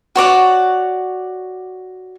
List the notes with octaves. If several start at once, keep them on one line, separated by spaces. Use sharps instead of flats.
F#4 C#5 D5 F#5